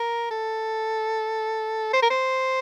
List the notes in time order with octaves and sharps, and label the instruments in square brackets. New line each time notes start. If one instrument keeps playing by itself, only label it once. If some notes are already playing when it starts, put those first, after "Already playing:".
Already playing: [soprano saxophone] A#4
A4
C5
A#4
C5